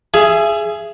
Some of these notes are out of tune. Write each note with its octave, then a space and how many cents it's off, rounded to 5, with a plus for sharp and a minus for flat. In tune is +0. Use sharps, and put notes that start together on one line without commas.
G#4 +5 E5 +30